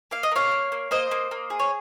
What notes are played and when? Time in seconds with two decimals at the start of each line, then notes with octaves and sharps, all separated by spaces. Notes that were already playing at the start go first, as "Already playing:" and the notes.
0.11 A#3 F5
0.23 D#5
0.31 A#3 C#5 F5
0.51 A#3
0.72 A#3
0.91 A#3 C5 D#5
1.11 A#3
1.31 A#3
1.50 G#4
1.59 C#5